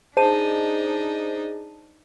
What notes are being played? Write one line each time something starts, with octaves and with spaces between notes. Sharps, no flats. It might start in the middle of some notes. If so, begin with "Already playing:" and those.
D4 D#4 G#4 C5 D#5 A5 D#7